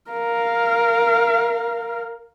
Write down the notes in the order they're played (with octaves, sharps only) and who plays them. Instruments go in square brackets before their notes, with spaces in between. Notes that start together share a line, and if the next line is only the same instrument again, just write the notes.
[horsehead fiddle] A#4 F5